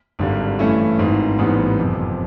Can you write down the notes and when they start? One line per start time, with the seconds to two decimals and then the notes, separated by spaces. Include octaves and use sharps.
0.19 G#1 G2 D3 G3
0.59 G2 E3 A3 C#4 E4
0.98 G#1 G#2 E3
1.38 A1 G#2 E3 G3 B3
1.78 F#1 F2 C3